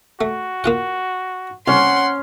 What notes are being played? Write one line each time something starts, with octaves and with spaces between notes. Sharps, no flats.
A3 F#4
A#3 F4 F#5
C2 C#4 F#5 C6